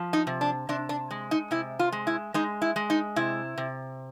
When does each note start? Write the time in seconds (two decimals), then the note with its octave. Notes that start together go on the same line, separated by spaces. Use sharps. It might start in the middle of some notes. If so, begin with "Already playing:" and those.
Already playing: F3
0.13 D#4
0.27 C3
0.41 D4
0.69 C3 D4
0.89 D4
1.11 G#3
1.31 D#4
1.51 C3 E4
1.79 F4
1.92 G#3
2.07 E4
2.34 G#3 D#4
2.62 E4
2.76 G#3
2.90 D#4
3.16 C3 E4
3.58 C3